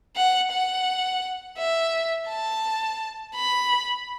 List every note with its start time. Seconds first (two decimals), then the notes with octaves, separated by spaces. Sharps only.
0.16 F#5
0.52 F#5
1.59 E5
2.29 A5
3.35 B5